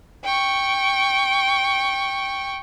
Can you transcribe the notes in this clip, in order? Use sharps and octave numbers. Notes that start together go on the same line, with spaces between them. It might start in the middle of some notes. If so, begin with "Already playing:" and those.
G5 C#6